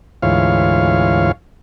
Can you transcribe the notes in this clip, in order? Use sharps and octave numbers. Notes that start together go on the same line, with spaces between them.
D2 G#2 E3 F4 C#5 F5